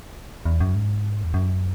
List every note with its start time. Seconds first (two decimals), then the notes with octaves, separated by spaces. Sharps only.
0.45 E2
0.60 F#2
0.75 G#2
1.24 E2
1.34 F#2